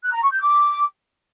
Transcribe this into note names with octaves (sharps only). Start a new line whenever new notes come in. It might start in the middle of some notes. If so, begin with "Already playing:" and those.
F#6
A#5
C#6
G6
D6